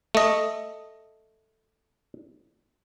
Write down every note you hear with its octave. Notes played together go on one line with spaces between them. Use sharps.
A3 D#5